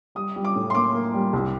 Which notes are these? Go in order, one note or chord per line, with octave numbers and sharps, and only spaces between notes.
G3 D#6
G3
D6
A2
C6
A#3 D6
A#3
G3
C2